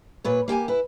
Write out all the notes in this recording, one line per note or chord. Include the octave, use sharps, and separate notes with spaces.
A#2 B4 C#5
A#3 G4 G5 G#5
E4 B4